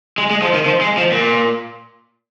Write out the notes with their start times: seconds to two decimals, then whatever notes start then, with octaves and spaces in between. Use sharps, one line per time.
0.18 G#3
0.31 G#3
0.42 F3
0.54 D#3
0.66 F3
0.81 G#3
0.97 F3
1.12 A#2